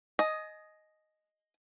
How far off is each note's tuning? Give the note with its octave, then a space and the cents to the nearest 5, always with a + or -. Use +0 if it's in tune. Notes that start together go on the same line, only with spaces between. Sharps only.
D#5 +0 G#5 +35